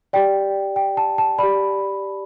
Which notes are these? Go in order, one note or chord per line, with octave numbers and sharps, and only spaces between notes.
G4 D5 G5
G5
A5
A5
G4 D5 B5